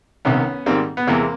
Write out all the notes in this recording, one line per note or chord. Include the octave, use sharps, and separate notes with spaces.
C2 C3 D#3 B3 C#4
G#2 D#3 G3 A#3 C4
B3
E2 C3 E3 G#3 A#3 C4